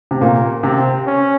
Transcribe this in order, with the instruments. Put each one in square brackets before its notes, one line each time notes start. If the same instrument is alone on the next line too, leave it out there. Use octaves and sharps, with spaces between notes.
[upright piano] C3
[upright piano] A#2 [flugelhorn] A#3
[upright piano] C3 [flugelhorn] C4
[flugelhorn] C#4